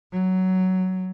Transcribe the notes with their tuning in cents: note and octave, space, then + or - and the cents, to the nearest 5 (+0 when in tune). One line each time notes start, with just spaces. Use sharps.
F#3 +10